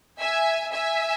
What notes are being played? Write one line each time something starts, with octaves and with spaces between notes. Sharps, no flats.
E5 G#5
E5 G#5